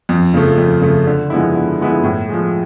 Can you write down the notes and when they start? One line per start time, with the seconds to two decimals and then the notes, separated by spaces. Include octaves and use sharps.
0.09 F2
0.34 C#3 F3 A3
0.58 F2
0.81 C#3 F3 A3
1.06 D3
1.30 F3 G#3 B3 E4
1.55 D3
1.79 F3 G#3 B3 E4
2.04 A2
2.29 F3 G#3